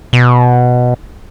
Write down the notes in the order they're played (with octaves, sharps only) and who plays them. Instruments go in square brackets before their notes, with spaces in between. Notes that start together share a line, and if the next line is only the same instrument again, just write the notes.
[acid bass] B2